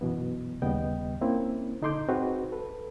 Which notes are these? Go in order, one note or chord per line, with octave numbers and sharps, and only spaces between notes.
F#2 B2 E3 B3
D#2 C#3 G3 B3 D#5 G5
A#3 C4 C#4 E4
D3 D#4 A4 C6 D6 G6
C4 D#4 F#4 G#4 B4
A4 B4